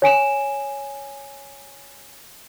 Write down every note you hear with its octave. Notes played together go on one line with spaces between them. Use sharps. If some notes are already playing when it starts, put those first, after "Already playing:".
C#5 G#5 D7 E7